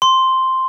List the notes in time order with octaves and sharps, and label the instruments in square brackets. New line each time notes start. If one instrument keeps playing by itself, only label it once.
[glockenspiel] C6